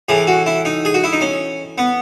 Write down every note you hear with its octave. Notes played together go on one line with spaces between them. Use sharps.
A2 E3 G#4
F#4
E4
D#4
G#4
F#4
E4
D#4
C#4
B3